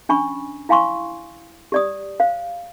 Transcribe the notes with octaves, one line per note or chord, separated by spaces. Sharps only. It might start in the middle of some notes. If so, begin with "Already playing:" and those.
C#4 D4 G#5 B5 C#6
E4 F5 G#5 C6 C#6
G4 D5 D#6
C5 F5